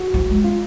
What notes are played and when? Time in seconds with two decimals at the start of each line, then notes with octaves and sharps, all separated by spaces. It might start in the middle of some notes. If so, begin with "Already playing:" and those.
Already playing: F#4
0.14 F3
0.29 G#3
0.44 F4